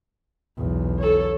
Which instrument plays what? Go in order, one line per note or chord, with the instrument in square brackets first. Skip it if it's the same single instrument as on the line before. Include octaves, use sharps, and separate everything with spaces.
[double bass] B1 E2
[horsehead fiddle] A4 C#5